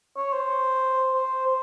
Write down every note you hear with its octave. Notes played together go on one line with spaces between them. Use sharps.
C#5
C5
C5
C5